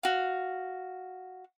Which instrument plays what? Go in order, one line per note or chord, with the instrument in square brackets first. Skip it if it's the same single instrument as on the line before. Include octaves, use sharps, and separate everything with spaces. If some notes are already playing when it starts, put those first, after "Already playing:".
[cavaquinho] F#4 F5